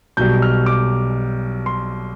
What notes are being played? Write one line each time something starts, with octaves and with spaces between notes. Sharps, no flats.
B1 B2 G3 G6
F6
D6
C6